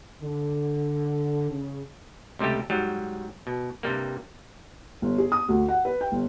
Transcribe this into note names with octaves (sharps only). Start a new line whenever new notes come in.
D3
C#3
C#2 C3 G3 A3 G4
G#2 F#3 G3
B2
G2 C3 G3 A#3
G1
G#4
D#6
D2
F#5
B4
G5
G1